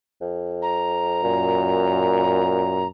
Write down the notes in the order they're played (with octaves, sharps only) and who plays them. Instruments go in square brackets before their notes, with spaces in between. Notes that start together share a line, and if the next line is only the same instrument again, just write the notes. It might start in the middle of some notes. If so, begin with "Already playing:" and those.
[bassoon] F2
[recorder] A#5
[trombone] F#2 [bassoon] A#2